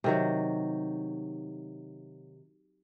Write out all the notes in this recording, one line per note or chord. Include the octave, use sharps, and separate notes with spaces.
C3 D#3 F#3